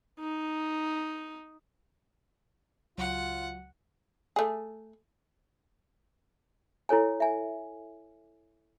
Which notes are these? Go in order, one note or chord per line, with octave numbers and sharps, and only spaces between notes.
D#4
C#2 F#3 F4 F#5
A3 G#4
E4 A4 C#5 G#5
E5 G#5